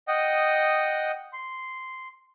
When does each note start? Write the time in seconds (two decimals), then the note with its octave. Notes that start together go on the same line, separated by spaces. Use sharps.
0.08 D#5 F#5 G5 D#6
1.33 C6